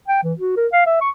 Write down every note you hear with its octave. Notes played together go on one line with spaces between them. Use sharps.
G5
E3
F#4
A#4
F5
E5
C#6